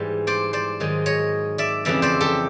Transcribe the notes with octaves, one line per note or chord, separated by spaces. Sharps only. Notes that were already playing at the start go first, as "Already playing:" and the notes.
Already playing: G#2 E3 G3
C5 D5
C5 D5
G#2 D#3 F#3
C#5 D#5
D5 E5
F2 C#3 E3 G3 D5 E5
C5 D5
G4 A4